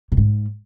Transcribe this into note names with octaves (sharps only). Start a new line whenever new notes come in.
B2
G#2